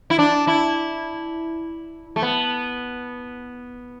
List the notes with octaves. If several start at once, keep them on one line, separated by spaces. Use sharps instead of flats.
E4
D4
E4
A3
B3